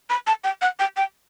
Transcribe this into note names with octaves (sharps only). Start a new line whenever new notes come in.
B5
A5
G5
F#5
G5
G5